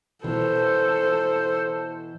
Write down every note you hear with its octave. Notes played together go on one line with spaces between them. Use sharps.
B2 E3 A4 C5